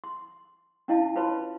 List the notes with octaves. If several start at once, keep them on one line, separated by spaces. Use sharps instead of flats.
C6
C#4 D4 E4 D#5 F5 A5
F4 B4 C#5 A5 B5 C6